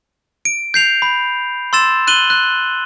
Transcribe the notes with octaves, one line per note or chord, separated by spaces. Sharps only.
D7
G6 C7 F7
B5
C6 E6 A6 E7
F#6 D#7 F#7 G7
F#6